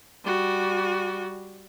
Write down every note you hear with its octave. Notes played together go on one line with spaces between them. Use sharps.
G3 F#4